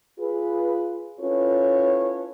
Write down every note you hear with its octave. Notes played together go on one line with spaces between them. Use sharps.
F4 G#4 B4
C#4 E4 F4 A4 B4 C#5